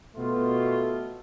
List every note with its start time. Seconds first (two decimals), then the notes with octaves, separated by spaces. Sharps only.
0.17 B2 A3 F4